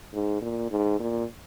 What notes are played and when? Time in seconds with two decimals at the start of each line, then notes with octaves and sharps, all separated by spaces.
0.14 G#2
0.42 A#2
0.71 G#2
1.00 A#2